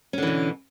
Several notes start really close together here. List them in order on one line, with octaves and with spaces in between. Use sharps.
C#4 D3 E3 B2